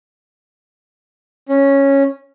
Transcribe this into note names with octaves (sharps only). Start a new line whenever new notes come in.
C#4